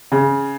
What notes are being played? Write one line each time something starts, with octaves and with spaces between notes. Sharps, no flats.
C#3